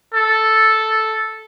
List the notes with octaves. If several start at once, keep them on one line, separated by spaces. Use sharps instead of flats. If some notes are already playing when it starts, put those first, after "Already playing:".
A4